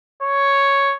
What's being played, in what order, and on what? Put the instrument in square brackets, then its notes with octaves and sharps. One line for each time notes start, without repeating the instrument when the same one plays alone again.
[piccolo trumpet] C#5